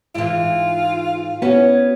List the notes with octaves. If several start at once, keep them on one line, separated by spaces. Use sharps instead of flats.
G#2 E3 F4
B3 C#4 E4 F#4 C#5